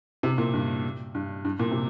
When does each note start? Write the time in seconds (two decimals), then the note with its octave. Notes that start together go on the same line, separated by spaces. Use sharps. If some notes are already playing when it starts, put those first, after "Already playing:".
0.23 C3
0.38 A#2
0.53 G2
1.15 G2
1.45 G2
1.59 A#2
1.71 C3